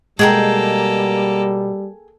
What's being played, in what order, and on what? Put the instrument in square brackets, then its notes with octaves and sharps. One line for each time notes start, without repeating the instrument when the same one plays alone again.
[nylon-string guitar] B2 G#3 [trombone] G3 [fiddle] A#3 A4 [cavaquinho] G#4 G5 A#5